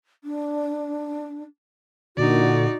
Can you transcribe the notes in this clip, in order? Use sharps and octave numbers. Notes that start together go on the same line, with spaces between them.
D4
A#2 D3 D#4 F#4 D5